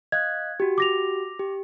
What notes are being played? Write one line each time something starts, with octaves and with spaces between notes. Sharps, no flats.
D#5 F5 F#6 G#6
F#4 G4
D6 A#6 F7
G4